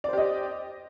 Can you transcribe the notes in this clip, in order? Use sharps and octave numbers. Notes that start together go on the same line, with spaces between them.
G4 C5 D5 D#5